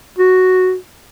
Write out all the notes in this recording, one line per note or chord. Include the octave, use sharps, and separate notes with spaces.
F#4